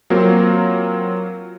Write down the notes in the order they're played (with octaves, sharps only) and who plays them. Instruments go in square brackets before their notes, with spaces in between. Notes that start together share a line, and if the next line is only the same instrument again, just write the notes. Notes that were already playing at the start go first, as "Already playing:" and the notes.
[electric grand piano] F#3 A#3 C4 F4 A#4